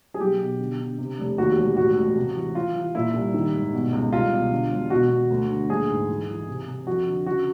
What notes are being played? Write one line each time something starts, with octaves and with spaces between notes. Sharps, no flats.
G#4
B1 G4
B2
D3
D3
C3
F1
D#2 F#4
E1
A2 F#4
A1
C3
E3
E3 F4
E3
A#2 E4
C2
D#3
G#1
B2
C#2
C2 F4
B2
D3
E1
B2 F#4
B2
D2
D3
A#1 G#4
G#2
E3
E3
C3
C3
F2 F#4
D3
C#3 F#4